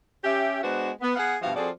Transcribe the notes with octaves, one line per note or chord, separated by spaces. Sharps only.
C#4 G4 E5
G#3 B3 D4 F#4 B4 C5
B3
B3 G#4 F5 F#5
G2 B2 F3 F#4 E5 F5
F3 C4 F#4 G#4 A4 D5